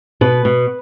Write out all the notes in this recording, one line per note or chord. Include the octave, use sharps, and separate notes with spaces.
B2 B4
B2